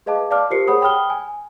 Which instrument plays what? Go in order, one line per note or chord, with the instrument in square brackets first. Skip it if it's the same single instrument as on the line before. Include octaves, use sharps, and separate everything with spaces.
[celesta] G#4 B4 D#5 F5 A5 D6
D5 F5 A5 D6 F6
F4 G4 A#4 C5 C7 C#7
G#4 C#5 F#5 B5 D#6
G5 B5 D#6 F6 G7
G#5